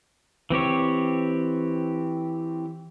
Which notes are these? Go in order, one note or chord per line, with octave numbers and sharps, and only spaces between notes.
E3 C4 G4 C#5